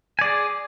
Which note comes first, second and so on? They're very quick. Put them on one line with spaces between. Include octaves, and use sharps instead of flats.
G#5 D5 G#4